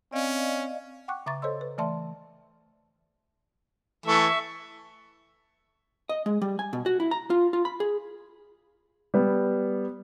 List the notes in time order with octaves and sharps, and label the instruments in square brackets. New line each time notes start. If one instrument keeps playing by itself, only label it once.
[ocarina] C4 [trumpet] C#4 [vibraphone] D5 D#5 F5
[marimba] F#5 G5 C#6 D6 F#6
C#3 E5 A#5 C#6 D6 A6
A4 C5 C#5 D#5 C6 E6
B4
E3 A3 D5 E5 A5 C6
[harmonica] E3 A3 A4 [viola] E5 C#6
[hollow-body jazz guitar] D#5
G#3
G3
G#5
B2
F#4
E4
A#5
F4
F4
B5
G#4
[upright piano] G3 B3